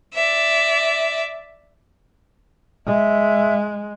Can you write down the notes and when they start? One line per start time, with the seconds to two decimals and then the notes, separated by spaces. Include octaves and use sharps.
0.14 D5 E5
2.86 G#3 E5